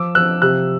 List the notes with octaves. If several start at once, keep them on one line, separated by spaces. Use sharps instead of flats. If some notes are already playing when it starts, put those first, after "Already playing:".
Already playing: F3 D6 E6
F3 E6 F#6
C3 E6 F#6